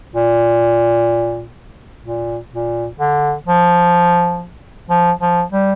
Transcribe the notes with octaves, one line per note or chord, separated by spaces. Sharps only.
A#2
A#2
A#2
D3
F3
F3
F3
G3